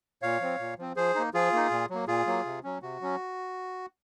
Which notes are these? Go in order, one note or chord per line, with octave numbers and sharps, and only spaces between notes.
A#2 C#5 F5
F3 C4
A#2
F3 C4
F3 G#4 C5
A#3 D#4
F3 F4 G#4
A#3 D#4
A#2
F#3 A#3
A#2 F4 G#4
F#3 A#3
C3
F#3 C#4
C3 F#4
F#3 C#4